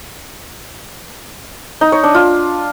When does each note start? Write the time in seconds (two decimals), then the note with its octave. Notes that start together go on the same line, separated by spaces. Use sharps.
1.81 D#4
1.92 C#5
2.03 D4
2.15 F4